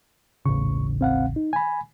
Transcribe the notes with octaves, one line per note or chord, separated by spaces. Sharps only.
D#1 A1 C#3 C#6
C4 F5 F#5
D#4
G#5 B5